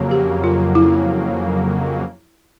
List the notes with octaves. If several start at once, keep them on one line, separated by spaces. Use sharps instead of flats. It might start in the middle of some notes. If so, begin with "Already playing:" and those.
Already playing: F2 C#3 F#3 A#3
G4
F4
E4